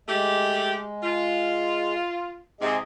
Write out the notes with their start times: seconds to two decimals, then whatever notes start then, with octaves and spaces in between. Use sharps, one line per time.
0.08 G#3 A3 G4
1.03 F4
2.61 G#2 C3 G#4 D#5